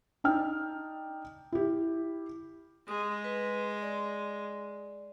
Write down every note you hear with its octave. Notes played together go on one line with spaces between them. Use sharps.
D4 D#4 G5 F6
E4 G4
G#3 D#6
B4
D5